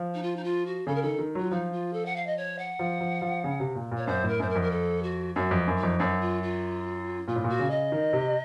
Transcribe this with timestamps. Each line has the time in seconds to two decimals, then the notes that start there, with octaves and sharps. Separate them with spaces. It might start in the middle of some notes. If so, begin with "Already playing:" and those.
Already playing: F3
0.14 D#4
0.23 F4
0.36 D#4
0.44 F4
0.66 F#4
0.87 C#3 A4
0.95 A#4
1.02 D#3 A4
1.19 D#3
1.35 F#3 F4
1.51 F3 D#4
1.72 F4
1.93 A4
2.06 F#5
2.16 F5
2.27 D#5
2.37 C#5
2.59 F#5
2.79 F3
3.01 F3
3.22 F3
3.44 C#3
3.60 C3
3.75 A#2
3.92 A#2
3.97 C#5
4.07 F#2 C5
4.24 A2 A#4
4.40 F#2 C5
4.50 A#4
4.55 F2
4.62 A#4
4.71 A4
5.03 F#4
5.35 F#2 F#4
5.51 F2
5.67 F#2
5.78 D#4
5.83 F2
5.99 F#2 D#4
6.21 F4
6.43 F4
7.28 A#2 F4
7.36 A2
7.44 A#2 F#4
7.59 C#3
7.70 D#5
7.92 D#3
8.13 C3